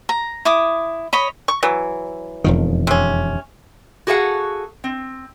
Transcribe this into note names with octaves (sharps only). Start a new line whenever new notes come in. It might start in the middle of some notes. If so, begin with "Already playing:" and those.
A#5
E4 D6 D#6
C#5 D#5 B5
C#6
E3 F#3
E1 F2 D#3
C3 C#4
F#4 G#4 A4 F5 F#5
C4